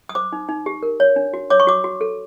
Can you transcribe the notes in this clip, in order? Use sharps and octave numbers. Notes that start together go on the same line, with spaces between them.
D#6
C5 D6
D#4
D#4
G4
A#4
C#5
D4
F#4
C#5 D6
C#6
F#4 D6
F#4
A4